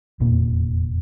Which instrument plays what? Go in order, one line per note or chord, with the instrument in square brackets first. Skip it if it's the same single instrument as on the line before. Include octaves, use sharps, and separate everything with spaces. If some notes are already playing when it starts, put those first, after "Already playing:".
[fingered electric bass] F1 E2 A#2 A#3